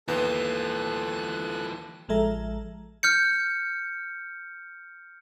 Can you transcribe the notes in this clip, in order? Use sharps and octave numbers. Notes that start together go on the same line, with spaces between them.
D#2 E3 B3 F4 A4 F#6
A1 F3 G#3 A4 E5 A#5
F6 G6 C#7